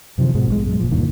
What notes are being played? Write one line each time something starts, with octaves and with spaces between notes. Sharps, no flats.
F#2 C3 D#3 F3
G#2 B2 G#3
A#1 C#3 G#3
F#2
A#1 A#2 F3
D2 G2 A#2 D#3